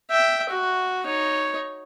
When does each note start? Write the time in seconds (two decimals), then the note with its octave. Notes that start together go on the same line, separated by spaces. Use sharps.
0.11 E5 G5
0.49 F#4
1.05 D#4 C#5